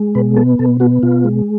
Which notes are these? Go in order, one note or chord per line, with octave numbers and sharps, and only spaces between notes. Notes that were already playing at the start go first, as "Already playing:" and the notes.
Already playing: G#3
B2 B4
B3 A4
B2 A4
B3 F#4
B2 F4
G#3